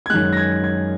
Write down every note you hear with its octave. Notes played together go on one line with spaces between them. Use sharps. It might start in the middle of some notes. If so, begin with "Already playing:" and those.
G#6
F#2 D#3 G#3 F#6
A#6
G#6
G#6